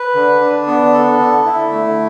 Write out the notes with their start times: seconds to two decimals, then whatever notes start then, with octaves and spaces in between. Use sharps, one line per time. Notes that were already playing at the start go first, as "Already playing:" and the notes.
Already playing: B4
0.15 D3
0.41 D4
0.67 B3
0.94 A4
1.20 D3
1.46 E4
1.72 A3